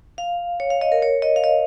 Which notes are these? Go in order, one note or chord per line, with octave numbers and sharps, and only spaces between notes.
F5
C#5
F5
D#5
A#4
C#5
D#5
F5
D#5